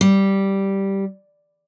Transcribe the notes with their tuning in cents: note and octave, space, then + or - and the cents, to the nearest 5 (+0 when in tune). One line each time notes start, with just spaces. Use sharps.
G3 -5